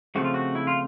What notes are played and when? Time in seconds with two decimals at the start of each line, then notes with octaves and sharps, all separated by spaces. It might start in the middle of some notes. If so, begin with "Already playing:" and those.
0.15 C#3 F3 A3 C4 F#4
0.24 F4
0.34 F#4
0.55 E4
0.67 F4